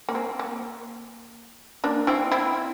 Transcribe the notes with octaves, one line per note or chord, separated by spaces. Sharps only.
A#3
C4
A#3
A#3 D4
C4 E4
C4 E4